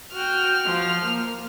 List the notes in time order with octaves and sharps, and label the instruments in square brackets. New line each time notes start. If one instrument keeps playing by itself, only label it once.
[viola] F#4 G5 [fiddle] F6
[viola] F3
A#3